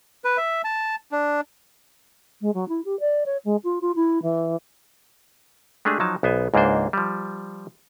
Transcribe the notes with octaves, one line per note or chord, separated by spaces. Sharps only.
B4
E5
A5
D4
G#3
F#3
E4
G4
D5
C#5
G#3
F4
F4
E4
E3
G#3 A3 D4 G4 G#4
F3 F#3 D#4 A5
B1 B3 C5 G#5
C#2 G#2 A#3 D4 C5
F3 G3